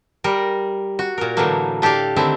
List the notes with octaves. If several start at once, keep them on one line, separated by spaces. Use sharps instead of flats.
G3 A#4
F#4
A#2 A#4
A2 D3 E3 F#3 A3 A#3
D4 G4 A4 D5 F5
D3 D#3 A3 C4 E4